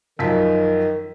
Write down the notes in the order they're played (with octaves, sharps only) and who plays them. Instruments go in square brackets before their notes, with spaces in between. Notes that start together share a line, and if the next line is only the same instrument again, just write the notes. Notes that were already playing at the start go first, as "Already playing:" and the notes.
[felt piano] F#2 F3 B6 [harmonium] D#3